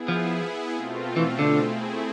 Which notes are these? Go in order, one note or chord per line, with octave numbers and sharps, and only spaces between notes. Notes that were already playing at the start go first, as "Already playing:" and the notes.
Already playing: B3 E4 G#4
F3
B2 A3 C4 F4
E3
D3
A3 C4 E4 G#4